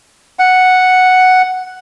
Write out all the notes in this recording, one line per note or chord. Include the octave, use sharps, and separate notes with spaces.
F#5